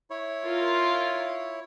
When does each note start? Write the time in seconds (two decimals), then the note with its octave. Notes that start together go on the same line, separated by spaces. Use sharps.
0.10 E4 C#5
0.45 F4 A#4